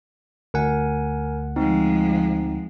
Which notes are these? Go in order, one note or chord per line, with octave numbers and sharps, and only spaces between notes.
D2 A#4 F#5 G#5
F3 G#3 C4 D#4